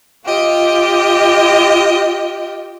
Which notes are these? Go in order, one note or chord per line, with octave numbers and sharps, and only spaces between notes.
F4 G4 D#5